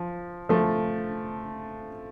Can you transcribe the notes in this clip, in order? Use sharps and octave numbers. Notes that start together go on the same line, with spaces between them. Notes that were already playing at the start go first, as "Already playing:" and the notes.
Already playing: F3
F3 A3